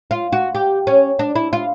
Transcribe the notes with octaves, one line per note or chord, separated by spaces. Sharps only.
F4
F#4
G4
C#4
D4
E4
F4